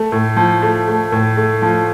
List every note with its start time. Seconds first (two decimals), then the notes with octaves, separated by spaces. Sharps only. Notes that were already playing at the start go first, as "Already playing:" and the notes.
Already playing: A3
0.12 A2
0.36 F3
0.62 A3
0.88 A3
1.12 A2
1.37 A3
1.62 F3